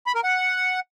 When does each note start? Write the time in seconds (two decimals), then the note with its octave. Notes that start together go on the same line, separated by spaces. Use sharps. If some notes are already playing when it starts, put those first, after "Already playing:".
0.06 B5
0.15 A#4
0.24 F#5